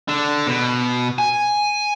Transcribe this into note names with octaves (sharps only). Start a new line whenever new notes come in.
D3
B2
G#5